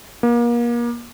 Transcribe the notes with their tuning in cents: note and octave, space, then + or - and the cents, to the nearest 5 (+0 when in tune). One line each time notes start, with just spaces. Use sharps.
A#3 +35